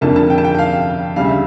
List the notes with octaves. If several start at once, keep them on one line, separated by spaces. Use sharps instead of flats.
F1 F2 D3 F3 A#3 A5
A5
G5
A5
G5
G5
F5
D2 C#3 G3 F5
E5